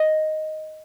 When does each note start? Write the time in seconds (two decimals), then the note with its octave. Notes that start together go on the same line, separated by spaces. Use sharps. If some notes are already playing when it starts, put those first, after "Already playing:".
Already playing: D#5